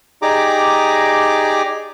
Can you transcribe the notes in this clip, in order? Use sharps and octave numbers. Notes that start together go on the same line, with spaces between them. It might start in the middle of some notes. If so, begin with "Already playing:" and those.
D#4 G4 G#4 D5 A#5 D6